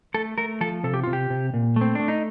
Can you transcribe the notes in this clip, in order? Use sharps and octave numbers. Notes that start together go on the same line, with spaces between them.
A3 A4
A3 A#4
F3 A4
C3 A4
G4
C3 F4
G4
C3
A#2
A3 C4
A3 D4
D#4